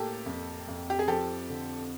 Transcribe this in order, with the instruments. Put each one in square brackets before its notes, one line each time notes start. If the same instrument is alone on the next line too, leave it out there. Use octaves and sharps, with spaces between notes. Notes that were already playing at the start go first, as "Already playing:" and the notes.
Already playing: [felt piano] A2 A#3 [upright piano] G4 A4
[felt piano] F2
F2
[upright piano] G4
G#4
[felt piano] F3 [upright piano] G4 A4
[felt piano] D3